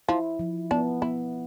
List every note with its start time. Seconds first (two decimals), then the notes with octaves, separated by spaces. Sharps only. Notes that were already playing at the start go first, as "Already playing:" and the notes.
0.09 F3 E4
0.39 F3
0.71 B3 D4
1.02 B3 E4